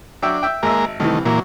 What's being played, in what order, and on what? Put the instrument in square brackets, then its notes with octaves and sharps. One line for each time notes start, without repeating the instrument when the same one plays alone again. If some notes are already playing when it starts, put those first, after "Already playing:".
[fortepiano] F#3 E5 G5 [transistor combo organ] D4
[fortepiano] E5 G5
[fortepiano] G#1 E5 [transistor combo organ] G#3 A#3 A#4
[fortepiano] C2 E3 [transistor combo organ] D#3 A3
[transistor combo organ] A#2 E3 A#3 [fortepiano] F#3